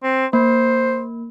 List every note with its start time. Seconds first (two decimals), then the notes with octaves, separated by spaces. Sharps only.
0.03 C4
0.33 A#3 C5